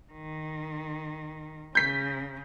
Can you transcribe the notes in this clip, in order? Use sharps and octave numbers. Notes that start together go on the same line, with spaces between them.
D#3
C#3 G6 B6